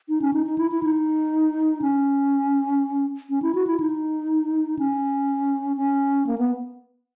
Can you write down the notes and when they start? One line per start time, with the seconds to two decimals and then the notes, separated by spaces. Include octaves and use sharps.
0.09 D#4
0.22 C#4
0.33 D#4
0.46 D#4
0.58 E4
0.71 E4
0.83 D#4
1.82 C#4
3.30 C#4
3.42 E4
3.55 F#4
3.67 E4
3.80 D#4
4.79 C#4
5.77 C#4
6.27 A#3
6.38 B3